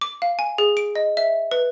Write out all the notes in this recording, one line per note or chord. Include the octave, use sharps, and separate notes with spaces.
D6
F5
G#5
G#4
D7
D#5
E5
B4